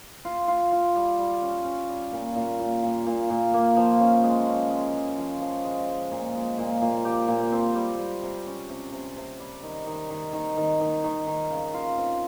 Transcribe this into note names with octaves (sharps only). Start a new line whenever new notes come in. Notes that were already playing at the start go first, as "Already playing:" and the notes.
F4
F4
F4
G3
G3
C#4
C#4
G3
A#2
A#2
A#2
A#2
A#2
A#2
A#3
F3
C#4
G#3
C#4
G#3
G#3
F3
F3
G#3
G#3
A#2
G#3
A#2
A#2
G4
A#2
C4
G3
G3
C3
C#4
C3
C3
C3
G3
D#3
D#3
D#3
D#3
D#3
D#3
D#3
D#3
C#3
F4
C4